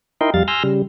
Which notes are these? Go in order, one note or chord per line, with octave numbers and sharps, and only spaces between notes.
D#4 E4 A#4 D#5 G5 C6
F2 G3 F5 A6
G#5 C6 E6 F6 G6 A#6
C#3 G3